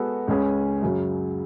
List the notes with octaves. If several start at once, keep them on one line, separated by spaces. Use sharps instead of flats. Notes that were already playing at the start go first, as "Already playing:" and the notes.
Already playing: G#3 B3 F#4 A4
C#2 C#3 G#3 C#4 G#4
F#2 C#3 F#3